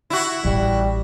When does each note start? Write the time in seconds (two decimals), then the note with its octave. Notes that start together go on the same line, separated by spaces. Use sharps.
0.10 E4 F#4
0.45 A1 G3